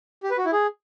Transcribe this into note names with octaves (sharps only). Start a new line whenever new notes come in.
G4
B4
F#4
E4
G#4